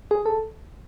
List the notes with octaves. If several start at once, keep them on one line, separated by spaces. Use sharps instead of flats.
G#4
A4